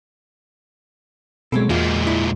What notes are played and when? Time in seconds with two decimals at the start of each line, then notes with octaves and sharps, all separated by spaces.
1.52 B2 F#3 G#3 C4 A4
1.69 E2 A#2 G#3 A#3 F4 F#4
2.07 E4 D5